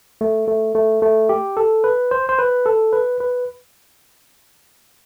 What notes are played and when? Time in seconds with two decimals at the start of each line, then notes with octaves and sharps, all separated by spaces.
0.21 A3
0.48 A3
0.75 A3
1.02 A3
1.29 G4
1.57 A4
1.84 B4
2.11 C5
2.29 C5
2.39 B4
2.66 A4
2.93 B4
3.20 B4